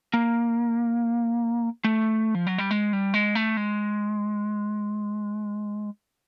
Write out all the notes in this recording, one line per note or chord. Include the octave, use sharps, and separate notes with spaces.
A#3
A3
F3
F#3
G3
G#3
G3
G#3
A3
G#3